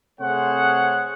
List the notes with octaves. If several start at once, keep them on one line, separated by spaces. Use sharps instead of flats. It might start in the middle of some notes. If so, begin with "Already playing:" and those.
C3 A3 G#4 C5 C#5 F#5